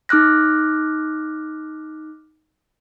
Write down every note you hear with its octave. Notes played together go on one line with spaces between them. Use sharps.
D#4 D6 F6 F#6 A#6